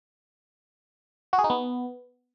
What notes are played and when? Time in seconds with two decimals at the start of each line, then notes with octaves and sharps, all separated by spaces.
1.33 F#4
1.39 G#4
1.44 D#4
1.50 B3